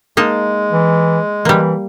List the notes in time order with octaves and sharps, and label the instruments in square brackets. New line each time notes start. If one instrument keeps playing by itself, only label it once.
[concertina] G#3 [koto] A#3 D#4 A5
[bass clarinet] E3
[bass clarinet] E3 [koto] G3 A#3